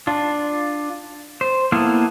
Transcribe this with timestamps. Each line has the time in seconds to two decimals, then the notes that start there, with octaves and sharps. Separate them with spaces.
0.07 D4 F4
1.41 C5
1.72 A#3 B3 E4 A4 F5